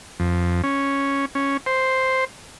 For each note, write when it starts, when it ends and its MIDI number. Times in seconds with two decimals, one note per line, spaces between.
0.20 0.62 41
0.64 1.25 61
1.35 1.57 61
1.66 2.25 72